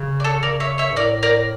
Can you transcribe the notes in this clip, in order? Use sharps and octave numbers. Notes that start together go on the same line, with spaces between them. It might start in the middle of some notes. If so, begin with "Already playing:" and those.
Already playing: C#3
D5
A4 C#5
C#3 A#4 D5
C#5 E5
C#5 E5
G2
A2 A#4 D5
A#4 D5